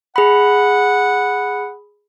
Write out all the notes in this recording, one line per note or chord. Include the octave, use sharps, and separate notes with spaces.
G#4 F#5 B5